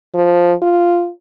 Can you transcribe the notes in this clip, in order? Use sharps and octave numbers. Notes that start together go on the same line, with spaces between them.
F3
F4